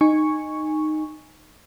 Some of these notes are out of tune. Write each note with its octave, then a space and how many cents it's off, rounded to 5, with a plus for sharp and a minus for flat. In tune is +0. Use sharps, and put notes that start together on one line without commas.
D#4 -10 G#5 -10 C#6 +0